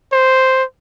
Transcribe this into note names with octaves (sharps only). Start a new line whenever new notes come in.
C5